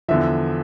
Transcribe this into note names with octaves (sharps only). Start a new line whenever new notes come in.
E2 D3 F3 E5